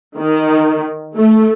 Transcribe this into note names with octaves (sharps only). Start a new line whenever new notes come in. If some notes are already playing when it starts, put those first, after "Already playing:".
D#3
A3